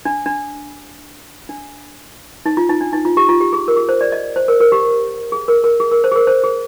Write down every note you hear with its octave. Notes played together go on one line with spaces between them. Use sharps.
D4
D4
D4
D#4
F4
D#4
D4
D#4
F4
G4
F4
G4
G#4
A#4
G#4
C5
D5
D#5
C5
A#4
A#4
G4
G#4
A#4
A#4
G#4
A#4
C5
G#4
A#4
C5
G#4